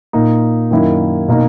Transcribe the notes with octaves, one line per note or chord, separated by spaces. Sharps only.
A#2 A#3 D#4
F#2 D#3 A#3 E4
B2 A#3 D#4